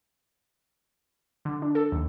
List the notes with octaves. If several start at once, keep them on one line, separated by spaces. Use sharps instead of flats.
D3
D4
A4
D#2